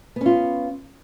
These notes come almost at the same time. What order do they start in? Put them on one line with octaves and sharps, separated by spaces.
B3 C#4 F4